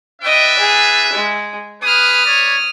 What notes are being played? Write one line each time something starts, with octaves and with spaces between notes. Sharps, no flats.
D4 B4 D#5 E5 G5
G#4
G#3
G#4 B4 D#6 F6
B4 C#5 D5